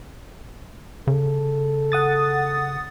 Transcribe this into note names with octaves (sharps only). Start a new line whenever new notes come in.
C#3 A4
F#5 D#6 A6